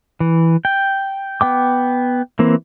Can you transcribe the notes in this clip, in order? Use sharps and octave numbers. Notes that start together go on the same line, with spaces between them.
E3
G5
B3 G5 D6
E3 A#3 C4